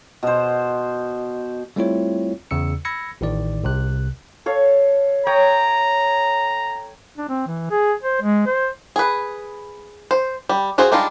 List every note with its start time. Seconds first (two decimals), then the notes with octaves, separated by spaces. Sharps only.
0.23 B2 C5
1.76 G3 A3 C4 E4 F4 C#5
2.51 E2 C#3 E6 C#7
2.85 B5 E6 G#6 A#6 C#7
3.21 A1 A2 D#3 D5
3.64 C2 C3 F#6
4.46 A4 C#5 F5
5.27 C#5 G5 A#5 D#6
7.17 D4
7.29 C4
7.47 E3
7.71 G#4
8.03 C5
8.22 G#3
8.46 C5
8.96 G#4 B4
10.11 C5
10.49 G3
10.78 F4 F#4 G#4 C5
10.92 G3 G#3 D4 D#4 F4